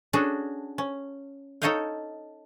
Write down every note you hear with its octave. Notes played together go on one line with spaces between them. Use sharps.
C#4 D4 F#4 G#4 A4
C#4
D#4 A4 C#5 D#5 F5 G5